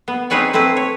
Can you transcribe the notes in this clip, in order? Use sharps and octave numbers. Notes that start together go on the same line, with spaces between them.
B3
C4 D#4 G#4 B4 C#5 D5
A3 C4 E4 B4
C#5